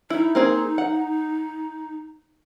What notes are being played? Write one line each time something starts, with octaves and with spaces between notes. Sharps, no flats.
D#4 E4
A#3 C4 G#4
F#5